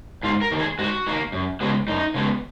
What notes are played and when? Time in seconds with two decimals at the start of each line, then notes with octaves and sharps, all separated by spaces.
0.23 G#2 F4
0.41 A#4
0.52 D#3 A#3
0.60 G#4
0.79 G#2 F#4
1.06 D#3 A#3
1.32 F#2
1.61 C#3 G#3 B3
1.87 F#2 D#4
2.14 C#3 G#3 B3